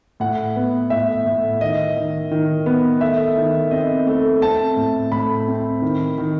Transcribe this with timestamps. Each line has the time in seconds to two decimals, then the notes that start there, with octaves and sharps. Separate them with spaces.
0.20 A2 F#5
0.56 B3
0.90 A2 E5
1.26 A2
1.61 D#3 D#5
1.96 D#3
2.31 D#3
2.66 B3
3.01 A3 E5
3.37 D#3
3.71 C4 D#5
4.07 A3
4.42 C4 A5
4.76 A2
5.12 A2 B5
5.48 C4
5.82 D#3
6.18 D#3